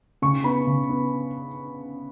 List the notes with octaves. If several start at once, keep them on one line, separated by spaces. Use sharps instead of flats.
C#3 C#6
B3 B5
C#3
B3